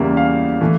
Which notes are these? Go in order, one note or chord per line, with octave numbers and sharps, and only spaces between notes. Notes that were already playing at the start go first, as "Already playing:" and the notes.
Already playing: E2 C#3 E3 G3 A#3 E5
F5
E3 A3